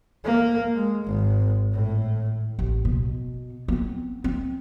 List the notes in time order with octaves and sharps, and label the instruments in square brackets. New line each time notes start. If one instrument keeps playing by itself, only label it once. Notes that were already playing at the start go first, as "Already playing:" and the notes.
[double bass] A#3
G#3
G#1
A2
[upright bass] A1
B2
B3 C4
C4